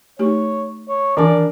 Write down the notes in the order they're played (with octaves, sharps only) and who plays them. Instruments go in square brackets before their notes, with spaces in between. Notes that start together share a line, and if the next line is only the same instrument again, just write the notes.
[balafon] A3 D#4 G4 [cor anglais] C#5
[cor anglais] C#5
[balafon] D#3 E3 G#5 [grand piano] D4 A#4 [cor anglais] D5